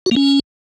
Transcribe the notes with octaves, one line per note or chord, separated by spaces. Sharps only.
F#4
A#3
C#4